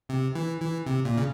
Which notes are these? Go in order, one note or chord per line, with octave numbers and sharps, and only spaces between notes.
C3
E3
E3
C3
A#2
C#3